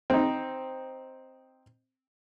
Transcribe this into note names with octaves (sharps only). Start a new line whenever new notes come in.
C4 D#4